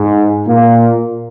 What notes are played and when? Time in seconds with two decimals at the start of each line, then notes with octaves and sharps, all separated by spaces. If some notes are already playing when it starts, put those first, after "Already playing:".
Already playing: G#2
0.47 A#2 A#3